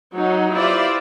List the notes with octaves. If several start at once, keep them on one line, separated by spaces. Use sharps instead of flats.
F#3 D#4
E4 F4 G4 C5 D5 E5